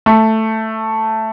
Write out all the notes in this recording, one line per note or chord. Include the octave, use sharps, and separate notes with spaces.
A3